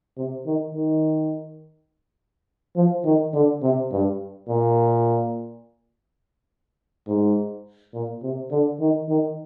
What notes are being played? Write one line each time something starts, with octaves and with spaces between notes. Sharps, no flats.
C3
D#3
D#3
F3
D#3
D3
C3
G2
A#2
G#2
A#2
C3
D3
D#3
D#3